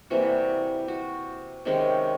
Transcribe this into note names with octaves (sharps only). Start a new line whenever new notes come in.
C3 E3 G3 A#3 F#4
F#4
C3 D#3 G#3 C#4